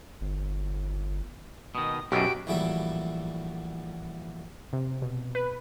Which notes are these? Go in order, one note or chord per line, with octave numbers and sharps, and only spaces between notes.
G1
B2 D#3 D#6
B1 F#2 B2 F#4 G4 D7
A#1 A2 E3 F#3 G3 E5
C3
B2
B4